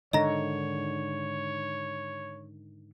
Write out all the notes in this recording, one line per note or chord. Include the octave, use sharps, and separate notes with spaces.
G#2 D3 D#3 C#5 D#5 A#5 A#6